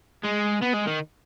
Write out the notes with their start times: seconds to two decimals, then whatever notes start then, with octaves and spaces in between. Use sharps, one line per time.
0.23 G#3
0.62 B3
0.73 G#3
0.86 D#3